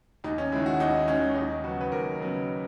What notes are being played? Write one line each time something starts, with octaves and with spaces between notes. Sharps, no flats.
D#2 D#4
C#4
D#3 G#3 E4
F#4
D#2 D#4
D#3 G#3 C#4
D#2 D#4
C#3 F#3 B3 F#4
B4
D#2 A#4
C#3 F#3 B3